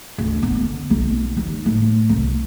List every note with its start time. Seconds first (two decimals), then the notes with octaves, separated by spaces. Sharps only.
0.18 D2
0.43 B3
0.61 D3
0.90 B1
1.37 D#2
1.66 A2
2.09 C2